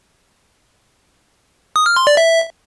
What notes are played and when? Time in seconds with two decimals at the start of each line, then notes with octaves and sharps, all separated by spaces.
1.76 D#6
1.86 F6
1.96 C6
2.07 D5
2.17 E5